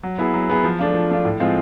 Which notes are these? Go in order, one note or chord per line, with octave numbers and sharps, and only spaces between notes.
F#3
B3 E4 G#4
F#3
B3 E4 G#4
F3
A3 D4 F4
F3
A3 D4 F4
A2
F3 G#3 C4 F4